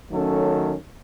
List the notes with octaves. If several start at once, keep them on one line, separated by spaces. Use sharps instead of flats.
D#3 F#3 A3 C#4 A4